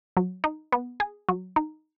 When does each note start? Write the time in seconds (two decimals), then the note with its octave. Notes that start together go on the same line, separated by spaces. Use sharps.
0.17 F#3
0.44 D#4
0.72 B3
1.00 G#4
1.29 F#3
1.56 D#4